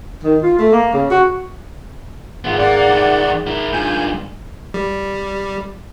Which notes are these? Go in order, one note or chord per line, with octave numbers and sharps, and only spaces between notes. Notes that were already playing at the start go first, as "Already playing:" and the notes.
D#3
F4
A3
A#3
C#3
F#4
G#1 B3 F4
A#3 D5 F#5
C2 D#3
E4 A#4
G2 A#2 G#5 G6
G3